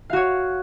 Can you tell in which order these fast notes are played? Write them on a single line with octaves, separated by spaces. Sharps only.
F5 F#4 C#5